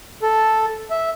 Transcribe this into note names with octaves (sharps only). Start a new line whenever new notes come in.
A4
E5